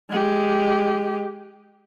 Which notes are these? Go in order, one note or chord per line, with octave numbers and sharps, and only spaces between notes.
G#3 G4